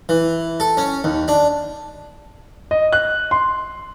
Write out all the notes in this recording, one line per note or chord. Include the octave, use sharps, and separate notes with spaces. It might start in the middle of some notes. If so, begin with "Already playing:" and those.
E3
A4
C#4
D#2
D4
D#5
F#6
C6